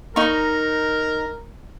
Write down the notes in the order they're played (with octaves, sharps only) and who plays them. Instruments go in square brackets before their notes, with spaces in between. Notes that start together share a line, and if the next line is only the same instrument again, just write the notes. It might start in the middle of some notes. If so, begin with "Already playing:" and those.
[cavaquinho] D#4 C#6 [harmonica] A#4